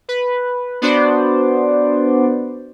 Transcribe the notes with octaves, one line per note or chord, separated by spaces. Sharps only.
B4
B3 D4 F#4 C5 D5